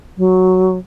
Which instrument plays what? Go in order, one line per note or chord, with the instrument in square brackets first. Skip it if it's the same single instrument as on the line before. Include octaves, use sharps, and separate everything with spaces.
[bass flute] F#3